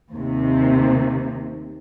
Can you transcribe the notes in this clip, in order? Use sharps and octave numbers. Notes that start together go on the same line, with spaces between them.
D#2 C3